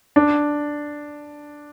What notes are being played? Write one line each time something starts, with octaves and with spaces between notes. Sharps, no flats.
D4